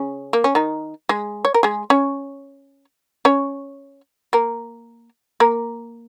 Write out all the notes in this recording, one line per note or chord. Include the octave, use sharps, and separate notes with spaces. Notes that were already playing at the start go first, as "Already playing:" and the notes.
Already playing: C#3 C#4
A#3
C#4
D#3 D#4
G#3 G#4
C#5
A#4
G#3 G#4
C#4 C#5
C#4 C#5
A#3 A#4
A#3 A#4